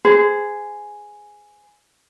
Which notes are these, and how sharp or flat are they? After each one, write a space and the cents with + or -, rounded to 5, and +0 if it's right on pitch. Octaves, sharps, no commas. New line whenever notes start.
G#4 +0 C5 -35